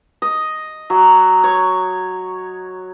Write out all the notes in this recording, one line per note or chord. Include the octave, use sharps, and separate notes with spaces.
D#5
F#3
C#5